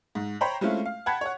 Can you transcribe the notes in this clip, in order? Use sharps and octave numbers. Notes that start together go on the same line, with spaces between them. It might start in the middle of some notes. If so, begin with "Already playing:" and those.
G#2
C5 C#5 G5 A#5 B5
G#3 A3 C4 C#4 E4 F4
F5
F#5 G5 A5 B5 G#6
C#5 F#5